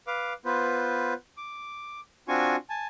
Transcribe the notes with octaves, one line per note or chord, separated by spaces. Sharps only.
B4 F5 D6
B3 F4 B4 C5
D6
C4 D4 F4 F#4 G#5 C#6
G#5 A5